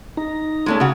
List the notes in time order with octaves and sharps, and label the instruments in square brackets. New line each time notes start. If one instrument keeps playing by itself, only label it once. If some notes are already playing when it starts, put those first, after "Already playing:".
[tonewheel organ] D#4 A#5
[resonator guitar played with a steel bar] G#3 A3 C#4
C#3 F#4